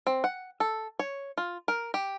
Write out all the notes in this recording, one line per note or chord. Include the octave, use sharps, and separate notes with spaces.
C4
F#5
A4
C#5
F4
A#4
G4